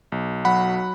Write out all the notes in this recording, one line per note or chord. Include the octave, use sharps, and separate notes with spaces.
B1
F#3 F#5 B5